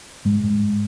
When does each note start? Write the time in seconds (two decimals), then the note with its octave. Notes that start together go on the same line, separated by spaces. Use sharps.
0.25 G#2 G#3
0.44 G#2